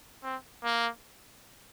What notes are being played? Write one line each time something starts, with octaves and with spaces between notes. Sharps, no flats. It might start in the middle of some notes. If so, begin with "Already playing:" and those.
C4
A#3